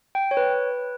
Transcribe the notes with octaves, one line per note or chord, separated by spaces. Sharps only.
G5
C#5
B4